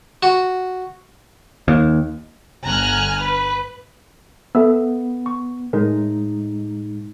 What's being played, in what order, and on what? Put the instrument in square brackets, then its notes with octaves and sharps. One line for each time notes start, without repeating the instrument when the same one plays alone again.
[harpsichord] F#4
[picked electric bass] D#2
[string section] G1 D3 G#5 A#5 F6 F#6
B4
[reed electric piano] B3 [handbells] A4 E5 E6
[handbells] C#6
[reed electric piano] A2 G#3 D#4 [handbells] A#4